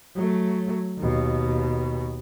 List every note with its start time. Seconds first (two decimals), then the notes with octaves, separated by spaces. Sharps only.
0.16 F#3 A3
0.99 D#2 B2